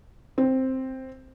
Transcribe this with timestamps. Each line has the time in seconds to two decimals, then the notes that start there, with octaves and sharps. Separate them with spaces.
0.38 C4